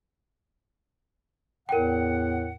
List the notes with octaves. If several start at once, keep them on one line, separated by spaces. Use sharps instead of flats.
E2 A2 A#4 F#5 G5